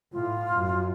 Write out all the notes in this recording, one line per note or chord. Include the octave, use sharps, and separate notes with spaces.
A2 F4
F#2